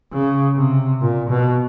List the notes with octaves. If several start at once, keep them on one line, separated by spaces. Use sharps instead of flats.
C#3
C3
A#2
B2